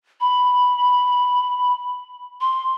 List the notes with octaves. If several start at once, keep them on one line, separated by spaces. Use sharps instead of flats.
B5
C6